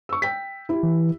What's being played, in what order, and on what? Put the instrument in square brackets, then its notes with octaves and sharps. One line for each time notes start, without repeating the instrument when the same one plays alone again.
[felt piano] C#6 E6
G5 B6
E4 G4
[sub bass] E3